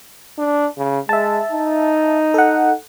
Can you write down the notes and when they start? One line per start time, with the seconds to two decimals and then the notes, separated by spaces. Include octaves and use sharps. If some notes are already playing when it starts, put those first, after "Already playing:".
0.38 D4
0.77 C#3
1.09 G#3 E5 A5
1.52 D#4
2.34 A4 F#5